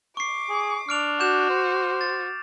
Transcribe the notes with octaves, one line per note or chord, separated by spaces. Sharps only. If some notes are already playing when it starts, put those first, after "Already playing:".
C#6 D6 C7
G#4
D4 F6 D7 F7
F#4 D6 G6 E7
C5
A6